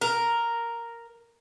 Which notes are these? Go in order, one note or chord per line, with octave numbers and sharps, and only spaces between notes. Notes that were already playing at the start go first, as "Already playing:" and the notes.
A#4